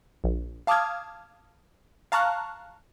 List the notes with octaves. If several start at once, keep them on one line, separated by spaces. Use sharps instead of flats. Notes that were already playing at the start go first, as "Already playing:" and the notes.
A#1
F5 A5 D6 D#6 F6 G#6
F5 A5 A#5 C#6 F6 F#6